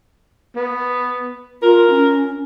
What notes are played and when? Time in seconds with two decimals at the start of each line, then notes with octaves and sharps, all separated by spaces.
0.56 B3
1.62 F4 A#4
1.90 C#4